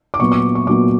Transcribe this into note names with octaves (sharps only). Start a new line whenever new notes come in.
D6
A#2 F#3 B3 C#6
D6
C#6
A#2 F#3 B3 D6